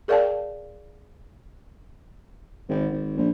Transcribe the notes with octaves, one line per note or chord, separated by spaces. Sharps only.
G#4 A#4 D5 F5 G5 A5
G#1
G#1
A#1